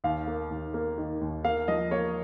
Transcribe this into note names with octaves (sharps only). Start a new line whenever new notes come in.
D#2 F5
A#3
D#2
A#3
D#3
D#2
A#3 F5
F3 D#5
A#3 C#5